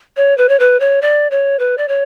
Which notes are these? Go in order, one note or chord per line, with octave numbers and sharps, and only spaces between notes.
C#5
B4
C#5
B4
C#5
D5
C#5
B4
D5
C#5